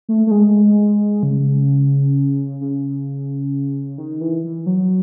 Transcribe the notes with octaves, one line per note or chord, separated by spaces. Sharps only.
A3
A3
G#3
C#3
C#3
D#3
E3
E3
F#3